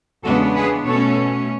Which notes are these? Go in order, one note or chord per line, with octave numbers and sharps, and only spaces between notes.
E2 C#3 G#3 B3 D4 F#4 A4
G#4 B4
B2 A3 C#4 A4 C#5